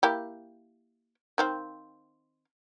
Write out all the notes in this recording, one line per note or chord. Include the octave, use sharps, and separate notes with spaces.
A#3 E4 G4
D#3 C4 F5